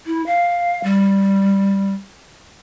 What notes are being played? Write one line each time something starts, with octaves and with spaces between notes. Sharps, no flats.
E4
F5
G3